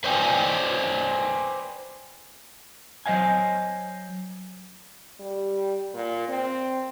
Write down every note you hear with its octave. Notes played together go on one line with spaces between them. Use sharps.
B4 C5 D5 G5 G#5
F#3 C5 D#5 F5 G#5
G3
A#2
C4